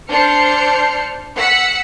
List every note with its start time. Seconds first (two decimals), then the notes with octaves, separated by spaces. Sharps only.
0.10 D4 C5 F6 G6 C7 C#7
1.38 F#5 E6 B6 C#7